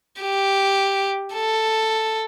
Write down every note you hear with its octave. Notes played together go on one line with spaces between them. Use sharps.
G4
A4